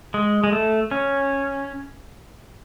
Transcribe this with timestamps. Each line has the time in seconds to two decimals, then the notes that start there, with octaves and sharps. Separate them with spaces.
0.14 G#3
0.44 G#3
0.52 A3
0.91 C#4